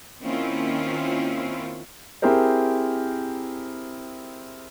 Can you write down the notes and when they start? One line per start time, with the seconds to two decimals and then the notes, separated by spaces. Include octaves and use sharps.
0.22 D#3 A#3 C4 C#4 E4 F4
2.22 C4 E4 G4 G#4 A#4 C5